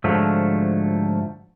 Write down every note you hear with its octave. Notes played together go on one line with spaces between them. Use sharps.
G#2 D3 F3 F#3 A3